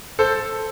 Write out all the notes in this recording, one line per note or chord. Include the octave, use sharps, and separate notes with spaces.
A4 C5